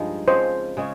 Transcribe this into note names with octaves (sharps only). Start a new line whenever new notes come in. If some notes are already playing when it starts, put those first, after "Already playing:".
Already playing: G2 F3 G#3 D#4
C#3 F3 G#3 C4 C5
C#3 G#3 C#4